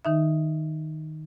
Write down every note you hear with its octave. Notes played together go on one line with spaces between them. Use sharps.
D#3 D#4 E5